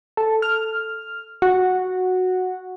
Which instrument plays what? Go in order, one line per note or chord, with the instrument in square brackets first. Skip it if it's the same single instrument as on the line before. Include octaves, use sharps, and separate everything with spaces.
[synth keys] A4
F6
F#4